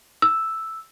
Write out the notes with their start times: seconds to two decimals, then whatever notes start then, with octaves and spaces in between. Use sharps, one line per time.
0.22 E6